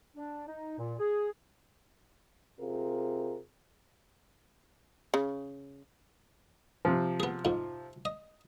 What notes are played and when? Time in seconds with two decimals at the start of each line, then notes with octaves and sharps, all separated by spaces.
0.16 D4
0.47 D#4
0.78 A#2
0.99 G#4
2.60 C3 F4 G#4 A#4
5.14 C#3
6.85 C3 F3
7.20 B3 G#4
7.45 F2 G#2
8.05 D#5